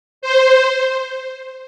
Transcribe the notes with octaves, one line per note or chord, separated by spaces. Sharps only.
C5